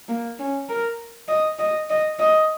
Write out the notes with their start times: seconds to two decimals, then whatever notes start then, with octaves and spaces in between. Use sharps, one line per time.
0.08 A#3
0.39 C#4
0.69 A#4
1.29 D#5
1.59 D#5
1.90 D#5
2.19 D#5